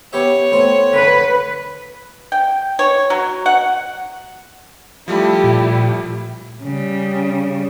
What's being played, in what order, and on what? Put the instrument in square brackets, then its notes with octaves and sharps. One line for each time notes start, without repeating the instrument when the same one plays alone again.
[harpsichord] B3 G4 E5 [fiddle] C#5
[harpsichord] A2 B3 C4
[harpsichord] D3 [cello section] B4
[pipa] G5
C#5
F#3
F#5
[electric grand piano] F3 G3 A3 [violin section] E4 G4 D5
[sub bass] A#2
[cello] C#3 G3